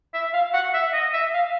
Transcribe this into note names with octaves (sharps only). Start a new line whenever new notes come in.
E5
F5
F#5
E5
D#5
E5
F5